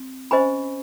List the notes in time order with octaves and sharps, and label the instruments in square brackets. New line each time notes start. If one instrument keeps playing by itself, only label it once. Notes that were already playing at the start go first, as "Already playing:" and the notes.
Already playing: [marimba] C4
[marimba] C#4 [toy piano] C5 D#5 G#5 B5